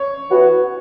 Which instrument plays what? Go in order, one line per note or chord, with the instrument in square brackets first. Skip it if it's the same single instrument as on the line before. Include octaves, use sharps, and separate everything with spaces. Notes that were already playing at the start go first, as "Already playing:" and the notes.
Already playing: [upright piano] C#5
[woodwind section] E3 B3 F#4